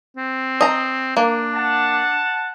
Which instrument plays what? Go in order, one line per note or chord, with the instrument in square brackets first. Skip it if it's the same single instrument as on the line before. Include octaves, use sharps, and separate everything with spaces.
[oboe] C4
[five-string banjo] D#5 A#5
[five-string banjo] A#3 [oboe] D4
[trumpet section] F#5 A5